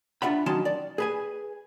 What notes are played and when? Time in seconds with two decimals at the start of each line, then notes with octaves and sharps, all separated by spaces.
0.22 D4 F4 E5 F#5 B5
0.46 D#3 F#3 C#4 D#4 A5 C6
0.65 D5
0.98 G#4 B4 G#5